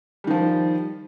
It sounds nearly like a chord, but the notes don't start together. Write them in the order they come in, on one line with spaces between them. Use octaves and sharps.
G3 D#3 F3